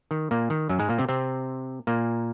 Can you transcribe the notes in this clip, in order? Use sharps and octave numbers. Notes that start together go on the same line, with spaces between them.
D#3
A#2 A#3
D#3
F#2 F#3
G#2 G#3
A#2 A#3
C3 C4
C3 C4
A#2 A#3